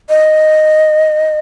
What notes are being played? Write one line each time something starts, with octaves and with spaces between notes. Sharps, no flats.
D#5